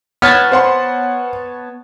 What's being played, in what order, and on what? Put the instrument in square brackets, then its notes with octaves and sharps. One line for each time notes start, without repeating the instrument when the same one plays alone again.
[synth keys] B3 C#5 A5 [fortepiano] F6
[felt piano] C5 F#5 C6